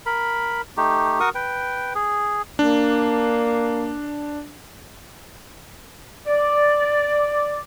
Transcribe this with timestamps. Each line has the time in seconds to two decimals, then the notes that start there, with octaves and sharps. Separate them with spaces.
0.06 A#4 B5
0.77 A3 D#4 G4
1.20 F#4 A#4 C#6 D#6
1.35 B4 G5
1.95 G#4
2.59 A#3 D4
6.27 D5